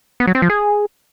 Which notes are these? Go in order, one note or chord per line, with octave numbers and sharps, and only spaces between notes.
B3
F#3
C4
F3
G#4